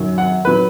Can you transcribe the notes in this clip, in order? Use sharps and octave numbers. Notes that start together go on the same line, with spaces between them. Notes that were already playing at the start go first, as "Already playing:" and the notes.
Already playing: F#2 D#3 F#3
F#5
D#3 F#3 B4